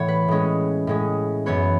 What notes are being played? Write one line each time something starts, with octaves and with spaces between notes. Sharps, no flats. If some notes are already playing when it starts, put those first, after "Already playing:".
Already playing: A2 E3 B3 C#5
B4
A2 G#3 C#4
A2 G#3 C#4
F#2 E3 B3 C#5